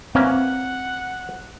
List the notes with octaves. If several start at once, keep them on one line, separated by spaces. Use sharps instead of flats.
E3 A#3 C4 C#4 F#5